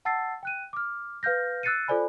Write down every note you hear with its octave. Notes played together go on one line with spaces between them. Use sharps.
F#5 A5 E6 A6 C7
G5 F#6 D#7
D6 F6
B4 F5 F6 G6 A#6
E6 F#6 A6 C7 C#7 D#7
F4 A4 C5 D5 G#5 B5